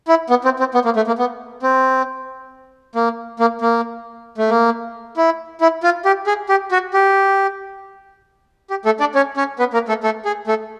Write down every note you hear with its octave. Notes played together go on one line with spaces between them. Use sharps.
E4
B3
C4
C4
B3
A#3
A3
A#3
B3
C4
A#3
A#3
A#3
A3
A#3
E4
E4
F4
G4
G#4
G4
F#4
G4
G4
A3 A4
D4 D5
C#4 C#5
C#4 C#5
B3 B4
A#3 A#4
A3 A4
A3 A4
G#4
A3 A4